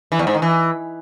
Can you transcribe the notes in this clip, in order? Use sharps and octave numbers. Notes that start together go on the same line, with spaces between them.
E3
E2
G#2
D#3
E3